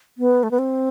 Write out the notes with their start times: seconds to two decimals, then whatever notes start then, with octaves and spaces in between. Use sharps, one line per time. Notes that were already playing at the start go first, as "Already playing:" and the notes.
0.18 B3
0.43 A3
0.51 B3
0.58 C4